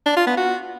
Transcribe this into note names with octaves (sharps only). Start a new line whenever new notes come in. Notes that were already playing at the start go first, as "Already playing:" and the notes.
D4
F4
B3
F#4